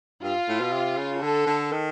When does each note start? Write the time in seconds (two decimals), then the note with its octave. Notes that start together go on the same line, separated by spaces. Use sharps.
0.23 G2 F4
0.49 A2
0.61 B2
0.72 C3
0.97 C#3
1.22 D3 A4
1.46 D3
1.72 D#3